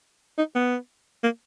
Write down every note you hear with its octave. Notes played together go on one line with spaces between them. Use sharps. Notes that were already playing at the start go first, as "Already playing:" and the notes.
D#4
B3
A#3